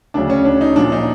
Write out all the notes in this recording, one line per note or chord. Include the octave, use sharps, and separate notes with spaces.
D2 C#3 F#3 D4
C#4
D4
D#4
A#1 A#2 F#3 D4
D#4